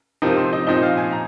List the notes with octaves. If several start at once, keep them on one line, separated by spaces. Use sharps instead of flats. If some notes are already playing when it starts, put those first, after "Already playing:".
C3 F3 C4 D#4 A#4
C5
D#5
A#2 F3 C4 D#4 D#5
F5
G#5
A#5